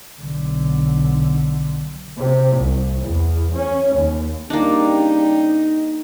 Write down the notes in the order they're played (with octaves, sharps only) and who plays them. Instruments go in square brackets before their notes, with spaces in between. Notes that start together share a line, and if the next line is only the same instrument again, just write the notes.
[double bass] B1 D3
[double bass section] C3
C2
E2
C#4
D#2
[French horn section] C#3 G3 G4 [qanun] A#3 D4 [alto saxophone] D#4